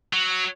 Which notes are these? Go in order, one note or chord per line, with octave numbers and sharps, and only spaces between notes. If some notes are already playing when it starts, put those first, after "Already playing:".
F#3